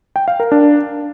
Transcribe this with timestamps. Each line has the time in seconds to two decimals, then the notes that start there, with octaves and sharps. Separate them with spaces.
0.16 G5
0.28 F5
0.40 A#4
0.52 D4